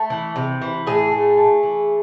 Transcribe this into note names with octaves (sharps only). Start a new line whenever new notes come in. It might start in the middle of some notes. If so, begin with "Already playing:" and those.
Already playing: A3
E3
C3
E3
A2 G#4
A3
A3
E3